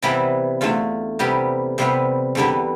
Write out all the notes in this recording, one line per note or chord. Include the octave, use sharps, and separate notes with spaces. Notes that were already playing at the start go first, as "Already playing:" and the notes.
C3 E3 G3 B3 E4
E2 D3 A3 F4
C3 G3 B3 G4
C3 G3 B3 C5
E2 D3 G3 B3